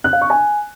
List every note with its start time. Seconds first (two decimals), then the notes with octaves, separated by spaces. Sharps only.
0.04 F#6
0.13 F5
0.21 C#6
0.30 G#5